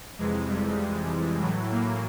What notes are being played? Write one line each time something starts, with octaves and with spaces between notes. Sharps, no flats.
F2 C3 E3 G#3
G3
A2 E3 F#3
A#3